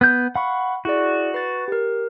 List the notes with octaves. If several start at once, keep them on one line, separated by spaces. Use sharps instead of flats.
B3 G6
F5 F#5 B5 C#6
E4 F#4 G#4 D5
B4 A6
G4 A#4